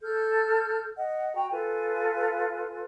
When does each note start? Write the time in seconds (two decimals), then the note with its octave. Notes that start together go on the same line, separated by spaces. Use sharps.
0.01 A4 F6 G6
0.96 D#5 F#5
1.34 F#4 G5 A#5
1.51 F4 A4 B4 G#5